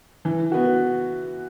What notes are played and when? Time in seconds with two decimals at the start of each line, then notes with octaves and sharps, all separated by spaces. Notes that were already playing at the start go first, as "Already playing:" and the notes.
0.25 E3
0.52 B3 F#4